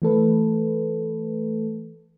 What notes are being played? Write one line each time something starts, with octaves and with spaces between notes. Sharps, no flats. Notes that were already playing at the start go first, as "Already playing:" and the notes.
E3 A3 A4 B4